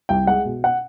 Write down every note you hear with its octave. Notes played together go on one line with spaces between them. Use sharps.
C2 G5
G#3 F#5
B2
F#5